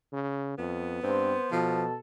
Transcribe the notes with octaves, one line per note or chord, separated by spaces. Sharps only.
C#3
F2 B3
G2 C4 C5
B2 F3 A4